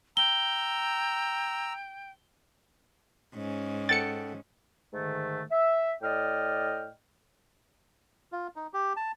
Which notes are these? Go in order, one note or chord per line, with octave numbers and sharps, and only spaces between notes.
G5 A#5 E6 G7
G#2 C#4
A4 F#5 G5 A6 C#7
G#2 D3 D#3 A3
E5
A2 D5 D#5 G5 F6
F4
D#4
G4
A5